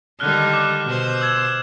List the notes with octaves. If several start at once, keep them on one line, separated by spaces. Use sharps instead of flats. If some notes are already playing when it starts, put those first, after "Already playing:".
D3 D#3 G3 F6 F#6
D6 F#6
B2 C5
E6 G#6 E7